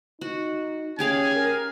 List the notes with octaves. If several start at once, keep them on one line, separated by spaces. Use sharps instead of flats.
D#4 F#4
C#4 G4 G#4 F5 G#5
A#4